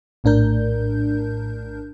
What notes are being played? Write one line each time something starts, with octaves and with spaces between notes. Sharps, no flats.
A#1 A2 D4 A#4 G6